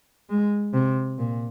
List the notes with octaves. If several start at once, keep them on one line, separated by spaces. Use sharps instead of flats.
G#3
C3
A#2